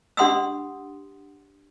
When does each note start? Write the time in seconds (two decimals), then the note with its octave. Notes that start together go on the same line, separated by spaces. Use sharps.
0.17 D4 G4 F#5 C6 D#6 E6